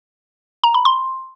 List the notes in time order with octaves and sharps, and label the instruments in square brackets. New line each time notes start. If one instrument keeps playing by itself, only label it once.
[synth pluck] A#5
B5
C6